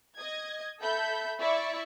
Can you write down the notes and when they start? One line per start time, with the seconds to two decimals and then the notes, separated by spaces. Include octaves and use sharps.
0.19 D#5 G#6
0.80 A4 E5 B5 G6
1.39 E4 D5 E5 C#6